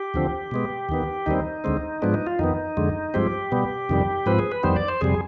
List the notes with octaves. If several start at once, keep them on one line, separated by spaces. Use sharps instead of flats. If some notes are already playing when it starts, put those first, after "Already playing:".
Already playing: G4
D#2 D3 F3 C4
B2 G#3 B3
D#2 D#3 B3
D#2 D#3 G3 C4 D#4
D#2 D3 G#3 C4
G#2 F3 G#3 B3 D4
D#4
F4
F2 D#3 B3 D#4
F2 D3 G#3
G2 F3 G#3 C4 G4
B2 G3 B3
F2 C3 D#3 G3
G#2 F3 C4 B4
G#4
B4
F2 D#3 G3 B3 C5
D5
C5
F2 C3 G3 G#4